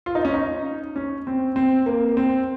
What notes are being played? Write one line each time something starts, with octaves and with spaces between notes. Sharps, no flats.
F4
D#4
C#4
D#4
C#4
C4
C4
A#3
C4